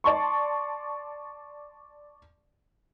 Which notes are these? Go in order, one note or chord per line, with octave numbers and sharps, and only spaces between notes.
D5 A5 C6 C#6